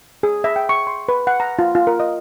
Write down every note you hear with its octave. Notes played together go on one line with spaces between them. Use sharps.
G#4
E5
G5
C#6
C6
B4
F#5
A#5
F4
F4
A#4
D#5